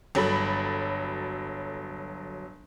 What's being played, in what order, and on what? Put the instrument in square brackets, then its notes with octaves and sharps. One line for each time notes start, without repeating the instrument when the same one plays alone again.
[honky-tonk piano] G1 F#3 A4 B5